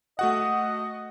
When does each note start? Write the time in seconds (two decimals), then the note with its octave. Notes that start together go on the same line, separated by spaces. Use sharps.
0.19 A3 F#4 D#5 F#5